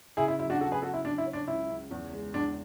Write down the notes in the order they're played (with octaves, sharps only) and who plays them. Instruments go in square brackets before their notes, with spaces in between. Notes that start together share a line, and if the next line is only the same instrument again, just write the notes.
[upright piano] C#3 [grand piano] E4 G#4
[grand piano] E4
[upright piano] F#3 [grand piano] E4
[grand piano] D4 F#4
[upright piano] F#3 [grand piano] F#4 A4
[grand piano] G#4 B4
[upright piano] F#3 [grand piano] F#4 A4
[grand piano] E4
[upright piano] F#3 [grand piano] D4
[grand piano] E4
[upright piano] C#4
[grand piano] D4
[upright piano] C#2 [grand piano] E4
[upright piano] C#2
E2
G#3
[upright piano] E2 [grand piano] D4